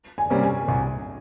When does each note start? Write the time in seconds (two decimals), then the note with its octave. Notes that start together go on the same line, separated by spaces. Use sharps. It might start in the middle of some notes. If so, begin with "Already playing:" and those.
0.18 G#5
0.30 C3 G3 A#3 C#4
0.43 G#5
0.68 C2